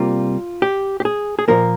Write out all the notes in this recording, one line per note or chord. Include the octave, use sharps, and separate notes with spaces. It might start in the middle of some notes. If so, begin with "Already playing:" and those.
Already playing: C3 G3 A#3 F4
G4
G4
G#4
G#4
A#2 F3 A#3 A#4